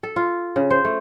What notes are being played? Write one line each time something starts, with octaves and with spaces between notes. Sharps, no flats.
A4
F4
C#3
C5
A3